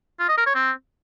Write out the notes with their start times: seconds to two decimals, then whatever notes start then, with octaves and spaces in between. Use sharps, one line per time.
0.20 F4
0.28 D#5
0.37 A#4
0.46 C#5
0.55 C4